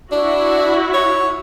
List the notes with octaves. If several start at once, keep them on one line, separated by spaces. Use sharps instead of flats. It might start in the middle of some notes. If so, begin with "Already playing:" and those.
D4 E4 F#4
C#5